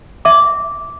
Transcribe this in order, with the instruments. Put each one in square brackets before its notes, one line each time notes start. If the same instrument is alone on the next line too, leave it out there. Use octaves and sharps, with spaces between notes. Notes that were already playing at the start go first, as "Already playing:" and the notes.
[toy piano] E5 D6